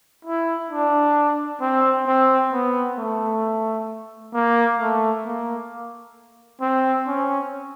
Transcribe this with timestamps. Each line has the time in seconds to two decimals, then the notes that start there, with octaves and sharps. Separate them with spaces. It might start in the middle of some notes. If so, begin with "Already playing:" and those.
0.25 E4
0.71 D4
1.61 C4
2.07 C4
2.52 B3
2.98 A3
4.34 A#3
4.79 A3
5.25 A#3
6.61 C4
7.07 C#4